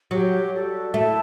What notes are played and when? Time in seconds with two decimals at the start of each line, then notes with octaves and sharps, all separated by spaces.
0.11 F#3 G4 C#5 G5
0.53 F#4 A4 D5
0.94 A3 E4 A4 E5 A5